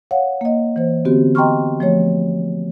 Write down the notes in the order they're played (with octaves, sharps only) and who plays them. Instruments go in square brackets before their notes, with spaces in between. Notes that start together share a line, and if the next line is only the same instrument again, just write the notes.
[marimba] C#5 F5 F#5
A#3 D#5
E3 A#3 C5
D3 B3 C4 F#4 G4
D#5 G5 A#5 C6 C#6 F6
F3 A3 C#5